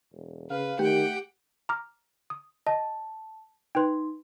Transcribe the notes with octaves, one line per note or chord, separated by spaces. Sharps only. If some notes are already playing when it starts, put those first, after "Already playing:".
E1
C#3 B4 F5
D#3 A3 G4 F#5 G5
A#5 D6 F6
D#6
D#5 A5
D#4 B4 G5 C6